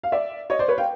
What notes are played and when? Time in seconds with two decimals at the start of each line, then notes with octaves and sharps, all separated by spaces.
0.03 F5
0.12 D5 E5
0.50 C#5 D#5
0.59 C5 D5
0.68 B4 C#5
0.78 F5 G5